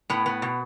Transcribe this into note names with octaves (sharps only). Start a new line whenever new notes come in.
A2 B3
B3
B2